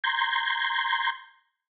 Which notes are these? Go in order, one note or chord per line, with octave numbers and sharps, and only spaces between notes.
A#5 C6 G6 G#6